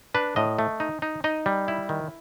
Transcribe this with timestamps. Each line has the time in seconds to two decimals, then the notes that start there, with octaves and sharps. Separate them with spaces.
0.14 D4 B4
0.36 A2 D#5
0.59 A3
0.80 D#4
1.02 D#4
1.24 D#4 D#5
1.46 G3
1.68 E4
1.89 D#3